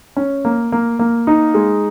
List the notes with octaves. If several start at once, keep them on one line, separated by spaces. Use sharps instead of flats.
C#4
A#3
A#3
A#3
D#4
G#3